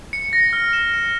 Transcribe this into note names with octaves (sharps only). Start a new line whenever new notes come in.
C#7
A#6
F6
E7
C#7